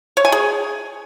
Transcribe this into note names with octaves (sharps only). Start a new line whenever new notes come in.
C#5
G#5
G#4